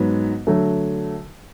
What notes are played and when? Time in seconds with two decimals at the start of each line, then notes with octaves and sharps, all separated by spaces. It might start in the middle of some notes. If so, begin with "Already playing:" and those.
Already playing: G#2 F#3 B3
0.47 D3 F#3 A3